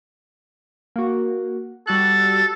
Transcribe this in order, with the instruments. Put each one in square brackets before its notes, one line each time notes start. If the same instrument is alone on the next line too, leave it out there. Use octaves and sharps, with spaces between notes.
[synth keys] A#3 F#4
[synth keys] G3 F#4 F#6 [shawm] A4